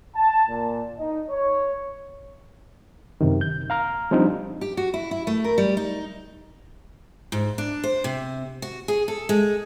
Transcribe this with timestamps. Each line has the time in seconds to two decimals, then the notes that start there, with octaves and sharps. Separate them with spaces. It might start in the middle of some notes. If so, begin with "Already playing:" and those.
0.15 A5
0.49 A#2
0.98 D#4
1.30 C#5
3.21 F#2 C3 D#3
3.41 G6
3.70 F5 A#5 F6
4.11 F3 G3 C4 D4 D#4
4.61 G4
4.77 F#4
4.94 E4
5.11 E4
5.27 A3
5.44 A#4
5.58 G3
5.77 D#4
7.32 G#2
7.58 D4
7.84 C5
8.04 C3
8.62 F#4
8.88 G#4
9.08 A4
9.29 G#3